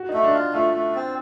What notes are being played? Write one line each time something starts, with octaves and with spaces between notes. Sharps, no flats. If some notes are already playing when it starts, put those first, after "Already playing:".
Already playing: F#4
A3 D#4
D4
F4
A3 F4
A3
C4